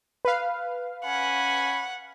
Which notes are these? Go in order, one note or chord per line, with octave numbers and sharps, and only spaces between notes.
B4 F5
C#4 F#5 G#5 B5